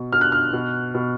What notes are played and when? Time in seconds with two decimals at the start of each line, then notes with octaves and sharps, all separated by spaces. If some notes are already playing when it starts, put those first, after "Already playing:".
Already playing: B2
0.12 B2 F6
0.21 F#6
0.32 F6
0.53 B2
0.95 B2